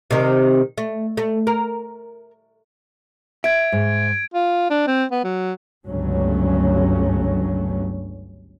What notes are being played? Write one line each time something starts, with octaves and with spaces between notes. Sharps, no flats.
C3 D#3
A3
A3
A#4
E5 G#6 D7
G#2
F4
D4
C4
B3
F#3
G1 C#2 G2 F#3 A3 C#4